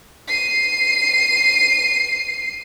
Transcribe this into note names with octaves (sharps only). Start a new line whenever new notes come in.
C7 D#7